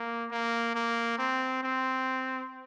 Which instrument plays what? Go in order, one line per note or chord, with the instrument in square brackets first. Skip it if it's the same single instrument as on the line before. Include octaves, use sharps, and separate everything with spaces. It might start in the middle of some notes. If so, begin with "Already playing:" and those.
Already playing: [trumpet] A#3
A#3
A#3
C4
C4